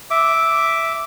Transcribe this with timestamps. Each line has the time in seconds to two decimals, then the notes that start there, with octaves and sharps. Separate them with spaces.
0.11 E5 D6